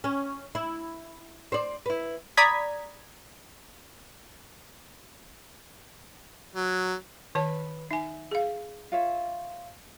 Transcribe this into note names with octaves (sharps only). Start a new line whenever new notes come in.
C#4
E4
C5 D5
E4 B4
D5 A#5 B5 D#6 G#6 B6
F#3
D#3 B4 C#5 A5
D#4 E5 G#5
G#4 F5
F4 C#5 E5